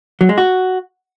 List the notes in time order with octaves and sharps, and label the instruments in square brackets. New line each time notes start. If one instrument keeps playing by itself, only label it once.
[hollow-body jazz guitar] F#3
G#3
F#4